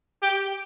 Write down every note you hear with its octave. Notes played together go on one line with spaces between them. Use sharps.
G4